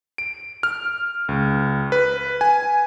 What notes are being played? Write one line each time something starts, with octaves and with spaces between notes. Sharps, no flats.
D7
F6
C#2
B4
G#5